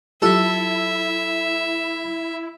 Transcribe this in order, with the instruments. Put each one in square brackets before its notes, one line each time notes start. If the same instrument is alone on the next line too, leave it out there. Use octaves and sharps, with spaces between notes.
[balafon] F#3 F4 G4 [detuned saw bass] E4 [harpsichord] A4 [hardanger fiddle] E5